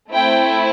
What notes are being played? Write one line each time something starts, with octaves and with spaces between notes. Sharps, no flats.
A3 C4 E4 G5